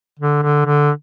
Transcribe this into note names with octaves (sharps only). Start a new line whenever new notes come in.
D3
D3
D3